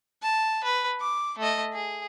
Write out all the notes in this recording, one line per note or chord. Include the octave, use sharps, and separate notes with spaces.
A5
B4
D6
A3 D#5
G#4